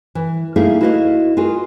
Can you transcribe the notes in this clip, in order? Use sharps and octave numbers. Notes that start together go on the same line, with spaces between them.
E3
A#3 D#4 E4 G#4 A4 F5
E4 F#4 B4 D#5 F5
F4 F#4 G#4 A#4